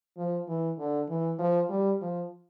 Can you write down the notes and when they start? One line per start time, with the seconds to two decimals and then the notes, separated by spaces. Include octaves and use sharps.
0.17 F3
0.48 E3
0.78 D3
1.09 E3
1.39 F3
1.69 G3
2.01 F3